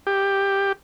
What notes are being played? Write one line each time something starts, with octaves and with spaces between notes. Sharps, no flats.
G4